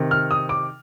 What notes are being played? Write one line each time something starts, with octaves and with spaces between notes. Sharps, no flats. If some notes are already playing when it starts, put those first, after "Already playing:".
Already playing: C3 D#3
F6
D#6
D6